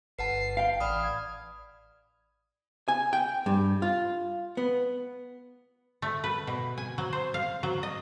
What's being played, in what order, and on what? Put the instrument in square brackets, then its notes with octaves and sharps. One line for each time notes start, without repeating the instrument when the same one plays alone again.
[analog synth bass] G1 [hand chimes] B4 F#5 A5 [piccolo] C7
[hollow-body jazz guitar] F5 [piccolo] G5
[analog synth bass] A1 [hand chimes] D5 B5 D#6 [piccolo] F6
[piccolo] G#6
[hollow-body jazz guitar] G#5
G5
G2
F4
B3
[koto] A3
B4
B2
G#5
F#3
C5
F5
F#3
D#5